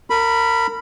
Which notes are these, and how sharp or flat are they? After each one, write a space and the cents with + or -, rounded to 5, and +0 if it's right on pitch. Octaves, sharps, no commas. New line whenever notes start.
A#4 -30 B5 +0